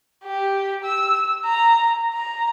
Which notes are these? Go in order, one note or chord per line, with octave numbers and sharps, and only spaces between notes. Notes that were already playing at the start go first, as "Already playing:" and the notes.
G4
E6
A#5
A#5